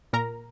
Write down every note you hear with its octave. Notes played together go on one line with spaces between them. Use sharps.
A#2 A#4 A#5